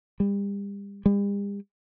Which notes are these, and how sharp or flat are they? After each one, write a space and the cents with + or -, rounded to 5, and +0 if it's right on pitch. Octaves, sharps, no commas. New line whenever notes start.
G3 +35
G3 +45